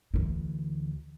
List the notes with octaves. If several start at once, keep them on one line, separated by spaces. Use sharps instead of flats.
D2 E3